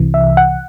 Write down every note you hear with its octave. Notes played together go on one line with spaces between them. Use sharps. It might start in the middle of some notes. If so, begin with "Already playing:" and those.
Already playing: C2 C3 E3
E5
F#5